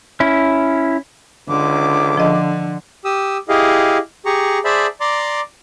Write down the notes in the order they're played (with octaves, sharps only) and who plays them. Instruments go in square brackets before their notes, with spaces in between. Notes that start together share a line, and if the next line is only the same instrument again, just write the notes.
[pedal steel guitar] C#4 E4
[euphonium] C#2 [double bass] D3 [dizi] D6
[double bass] D3 [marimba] F3 D#5
[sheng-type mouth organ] G4 D#6 E6
E4 G4 G#4 D#5 F5
G4 G#4 A#5 C#6
G#4 C5 D5 E5 A5 B5
D5 A#5 C6 D6